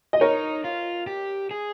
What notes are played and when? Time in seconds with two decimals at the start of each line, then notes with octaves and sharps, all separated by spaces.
0.13 D#5
0.21 D#4 A#4 C#5
0.64 F4
1.07 G4
1.51 G#4